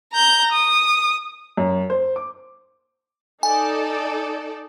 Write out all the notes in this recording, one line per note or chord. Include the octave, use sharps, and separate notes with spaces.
A#5 G6
D#6
F#2
C5
D6
D#4 A4 D5 G#5